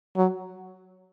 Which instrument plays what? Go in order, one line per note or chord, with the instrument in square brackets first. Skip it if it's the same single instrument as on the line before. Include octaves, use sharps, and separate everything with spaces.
[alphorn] F#3